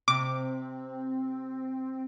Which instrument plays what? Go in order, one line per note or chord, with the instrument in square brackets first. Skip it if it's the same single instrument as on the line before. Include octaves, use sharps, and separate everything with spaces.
[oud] C3 [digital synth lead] C4 [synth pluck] D6